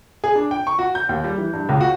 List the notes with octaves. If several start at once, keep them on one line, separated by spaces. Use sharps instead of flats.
G#4
D4
G5
C#6
F#4
G6
D#2
G3
E3
G2
C#2
F#4